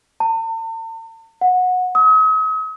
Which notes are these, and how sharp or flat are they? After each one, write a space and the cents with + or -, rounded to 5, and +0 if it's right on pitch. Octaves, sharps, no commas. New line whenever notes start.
A5 +45
F#5 -20
D#6 +45